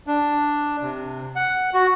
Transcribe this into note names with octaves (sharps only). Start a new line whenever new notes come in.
D4
C3
F#5
F#4